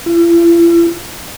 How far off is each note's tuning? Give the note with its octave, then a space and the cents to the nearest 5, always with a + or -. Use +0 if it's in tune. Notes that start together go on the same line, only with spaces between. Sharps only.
E4 +45